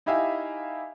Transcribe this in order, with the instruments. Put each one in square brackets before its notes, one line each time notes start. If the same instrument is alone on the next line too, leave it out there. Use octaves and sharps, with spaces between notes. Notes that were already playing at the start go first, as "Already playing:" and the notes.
[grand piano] D#4 E4 G4 E5 F5 G#5